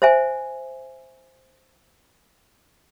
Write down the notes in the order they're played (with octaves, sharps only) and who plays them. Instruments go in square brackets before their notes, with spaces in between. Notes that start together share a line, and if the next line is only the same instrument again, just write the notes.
[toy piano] C5 E5 G#5